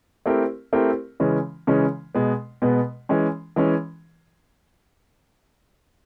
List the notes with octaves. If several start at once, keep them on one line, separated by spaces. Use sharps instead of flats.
A3 C4 E4 G4 A#4
A3 C4 E4 G4 A#4
C#3 E3 G#3 C#4
C#3 E3 G#3 C#4
B2 G#3 B3
B2 G#3 B3
E3 G#3 C#4
E3 G#3 C#4